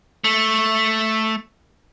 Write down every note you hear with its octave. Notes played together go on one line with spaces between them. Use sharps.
A3